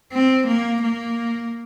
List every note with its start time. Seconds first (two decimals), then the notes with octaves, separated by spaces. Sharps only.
0.12 C4
0.47 A#3
0.82 A#3